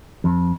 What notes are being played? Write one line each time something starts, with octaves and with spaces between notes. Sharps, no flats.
F2